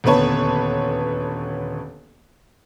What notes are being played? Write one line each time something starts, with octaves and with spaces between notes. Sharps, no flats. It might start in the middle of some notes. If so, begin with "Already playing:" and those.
D#1 D2 B3 B4 C#5 A5